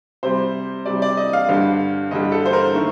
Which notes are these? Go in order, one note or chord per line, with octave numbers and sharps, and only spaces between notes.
C3 G3 C5
C3 G3 D5
D5
D#5
F5
G2 D3 G3 F5
G2 D3 G3 D#5
A4
C5
A#4
D#3 A3